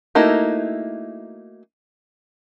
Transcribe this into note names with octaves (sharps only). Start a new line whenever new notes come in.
A3 A#3 D#4 E4 F#4